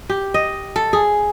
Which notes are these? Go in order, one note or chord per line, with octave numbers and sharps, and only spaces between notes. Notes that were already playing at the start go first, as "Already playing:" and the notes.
G4
D#5
A4
G#4